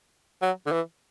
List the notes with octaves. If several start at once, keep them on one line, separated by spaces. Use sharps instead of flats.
F#3
D3
E3